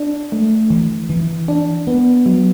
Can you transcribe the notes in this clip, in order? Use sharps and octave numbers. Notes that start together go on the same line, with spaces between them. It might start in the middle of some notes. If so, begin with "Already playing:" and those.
Already playing: D4
A3
E3
E3
D4
B3
F#3